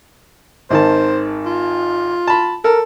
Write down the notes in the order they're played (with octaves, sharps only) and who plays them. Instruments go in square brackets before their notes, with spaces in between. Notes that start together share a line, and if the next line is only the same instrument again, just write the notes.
[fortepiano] G#1 D#3 A5 [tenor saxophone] C5
[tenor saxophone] F4
[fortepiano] A5 B5
[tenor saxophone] A4 [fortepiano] A#4